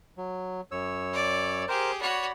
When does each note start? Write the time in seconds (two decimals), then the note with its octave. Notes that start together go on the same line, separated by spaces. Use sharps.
0.17 F#3
0.72 F#2 C#5 E6
1.13 D5
1.68 G4 G#4 A#4 C5
2.01 F#4 C#5 D5 B5